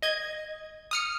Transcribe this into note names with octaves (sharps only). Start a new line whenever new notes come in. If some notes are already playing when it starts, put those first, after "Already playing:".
D#5 G#6
D#6 F6 C#7